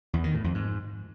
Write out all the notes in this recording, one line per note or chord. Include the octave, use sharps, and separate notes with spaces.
E2
D#3
A2
F2
G#2